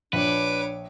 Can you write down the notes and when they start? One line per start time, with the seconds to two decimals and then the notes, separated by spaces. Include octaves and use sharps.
0.13 A#1 D4 B4 C#5 D6